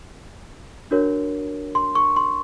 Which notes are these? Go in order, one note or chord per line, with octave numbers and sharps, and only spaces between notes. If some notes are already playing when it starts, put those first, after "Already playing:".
D4 F#4 A#4 C#5
C6
C#6
C6